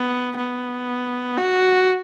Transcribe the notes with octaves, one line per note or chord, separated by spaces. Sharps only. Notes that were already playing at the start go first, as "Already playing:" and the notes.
Already playing: B3
B3
F#4